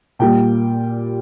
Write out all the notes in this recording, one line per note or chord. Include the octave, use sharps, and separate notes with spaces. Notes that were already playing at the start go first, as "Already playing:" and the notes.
A#2 G3 A#3 G5